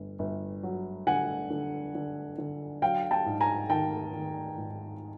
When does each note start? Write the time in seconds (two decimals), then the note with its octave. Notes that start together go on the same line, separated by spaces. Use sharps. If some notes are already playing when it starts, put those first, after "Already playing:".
Already playing: G1
0.19 G1
0.63 F#3
1.07 D3 F#5 G#5
1.50 D3
1.95 D3
2.38 D3
2.82 F#3 F5 G5
3.11 G5 A5
3.26 G#2
3.41 G#5 A#5
3.70 D#3 G5 A5
4.14 D#3
4.58 G#2